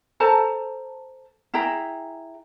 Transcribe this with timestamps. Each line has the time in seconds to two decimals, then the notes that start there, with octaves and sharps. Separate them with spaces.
0.20 A4 C5 A5 A#5
1.54 E4 G#4 G5 A#5